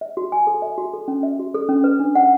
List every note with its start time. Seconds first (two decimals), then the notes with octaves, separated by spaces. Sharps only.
0.01 E5
0.17 F#4
0.32 G#5
0.47 A4
0.62 E5
0.78 F#4
0.94 A4
1.08 C#4
1.23 E5
1.39 F#4
1.54 A4
1.69 C#4
1.84 B4
2.00 D4
2.15 F#5